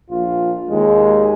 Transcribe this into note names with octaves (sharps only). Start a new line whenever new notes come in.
A#1 F4
D#2 G#3